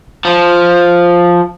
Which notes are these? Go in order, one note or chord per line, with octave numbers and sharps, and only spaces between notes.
F3